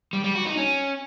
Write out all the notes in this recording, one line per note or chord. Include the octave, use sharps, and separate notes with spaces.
G3
G3
F#4
D#4
C#4